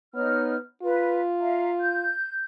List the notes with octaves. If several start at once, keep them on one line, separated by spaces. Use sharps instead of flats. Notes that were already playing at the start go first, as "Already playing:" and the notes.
B3 D#4 C#5 F6
F4 B4
E5 F5 A#5
G6